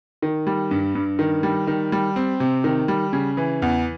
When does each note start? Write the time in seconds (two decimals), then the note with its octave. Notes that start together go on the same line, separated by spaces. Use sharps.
0.22 D#3
0.47 G3
0.71 G2
0.95 G2
1.19 D#3
1.43 G3
1.67 D#3
1.92 G3
2.16 C4
2.40 C3
2.64 D#3
2.88 G3
3.13 C#3
3.37 E3
3.62 E2